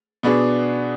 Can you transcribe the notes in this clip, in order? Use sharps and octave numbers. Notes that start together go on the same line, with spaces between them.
B2 B3 D4 G#4